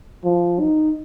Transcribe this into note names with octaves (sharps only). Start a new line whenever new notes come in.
F3
D#4